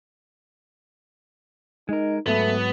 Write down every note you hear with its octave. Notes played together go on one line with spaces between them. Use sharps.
G#3 D#4 A#4
G#2 F#3 A3 B3